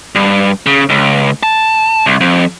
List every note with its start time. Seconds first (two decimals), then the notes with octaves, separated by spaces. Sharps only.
0.15 G2
0.66 C#3
0.89 C#2
1.43 A5
2.06 C2
2.21 F2